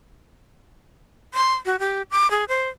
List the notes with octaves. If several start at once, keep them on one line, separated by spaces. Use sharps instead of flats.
C6
F#4
G4
D6
G#4
C5